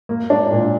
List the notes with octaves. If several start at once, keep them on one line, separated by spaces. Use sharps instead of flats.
A#3
D4
A#2